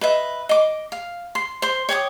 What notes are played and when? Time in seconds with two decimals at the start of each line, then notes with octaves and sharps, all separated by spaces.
0.01 B4 D#5 E5
0.49 D#5 D6
0.92 F5
1.35 C6
1.62 C5 C6
1.89 C#5 G5 D6 D#6